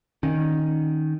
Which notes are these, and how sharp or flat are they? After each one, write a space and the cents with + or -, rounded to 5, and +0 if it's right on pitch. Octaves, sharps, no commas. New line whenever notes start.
D#3 +0 C#4 -20